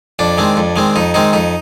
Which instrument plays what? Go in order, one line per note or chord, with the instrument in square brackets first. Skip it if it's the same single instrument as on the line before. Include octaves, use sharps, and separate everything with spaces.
[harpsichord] F2 D4
D#3 G#3 C4
F2
D#3 G#3 C4
F2 D#4
D#3 G#3 C4 D#4
F2 D#4